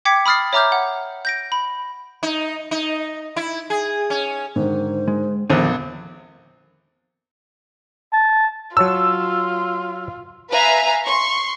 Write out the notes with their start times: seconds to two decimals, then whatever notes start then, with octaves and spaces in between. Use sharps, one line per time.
0.05 G5 D6 G#6 B6 C#7
0.26 B5 D#6 F6 A6 C7
0.53 C#5 E5 A#5 D6 F6 G6
0.72 F#5
1.25 G6 A#6 D7
1.52 B5
2.23 D#4
2.71 D#4
3.36 E4
3.70 G#4
4.10 C#4
4.56 G#2 D3 D#3 C5
5.08 G#3
5.50 A#1 E2 D3 D#3 F3 C4 F#6 D#7
8.13 A5
8.77 F#3 F4 C#5 A5 E6
10.50 B4 E5 F5 G#5 A#5
11.03 C6 C#6